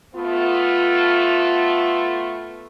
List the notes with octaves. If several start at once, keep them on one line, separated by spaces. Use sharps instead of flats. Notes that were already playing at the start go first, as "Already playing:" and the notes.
A3 B3 F4